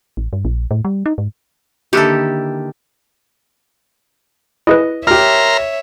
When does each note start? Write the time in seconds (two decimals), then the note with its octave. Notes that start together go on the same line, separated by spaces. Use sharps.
0.17 A1
0.33 G2
0.45 A#1
0.71 A2
0.85 G3
1.06 D#4
1.18 G#2
1.93 D3 D#3 A#3 D4 E4 G4 A4
4.67 E4 G#4 B4 D#5
5.07 G4 A#4 C#5 E5 A#5 C6 F6